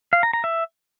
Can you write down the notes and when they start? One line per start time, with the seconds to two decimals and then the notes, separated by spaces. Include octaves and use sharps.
0.13 F5
0.23 A#5
0.33 A#5
0.44 E5